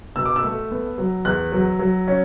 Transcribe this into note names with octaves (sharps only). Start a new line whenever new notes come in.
B2 E6
D6
E6
A3
B3
F#3
E2 F#6
F#3
F#3
C#4